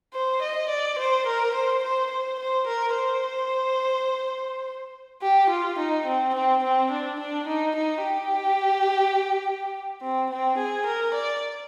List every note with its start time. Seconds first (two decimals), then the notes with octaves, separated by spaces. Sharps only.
0.14 C5
0.42 D#5
0.69 D5
0.99 C5
1.27 A#4
1.54 C5
1.83 C5
2.11 C5
2.40 C5
2.67 A#4
2.96 C5
5.22 G4
5.50 F4
5.79 D#4
6.07 C4
6.35 C4
6.63 C4
6.92 D4
7.20 D4
7.47 D#4
7.76 D#4
8.04 G4
10.02 C4
10.31 C4
10.58 G#4
10.86 A#4
11.14 D5